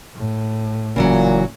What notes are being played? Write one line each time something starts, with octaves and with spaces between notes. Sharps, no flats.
A2
F#1 A#2 C#3 E3 F#3